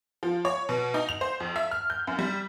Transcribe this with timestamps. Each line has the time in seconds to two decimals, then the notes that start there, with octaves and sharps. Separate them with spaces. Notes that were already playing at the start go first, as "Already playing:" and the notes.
0.23 F3
0.45 C#5
0.69 B2
0.94 D#4
1.09 F7
1.21 C5
1.40 F2
1.56 E5
1.71 F6
1.90 G6
2.07 F#2
2.19 G3